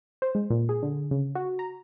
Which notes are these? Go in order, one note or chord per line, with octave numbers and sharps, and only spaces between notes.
C5
G#3
A#2
G#4
D3
C#3
F#4
A#5